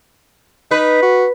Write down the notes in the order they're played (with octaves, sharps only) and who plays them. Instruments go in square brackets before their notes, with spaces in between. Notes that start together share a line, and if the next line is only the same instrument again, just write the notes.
[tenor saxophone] D#4 [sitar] B4
[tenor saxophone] F#4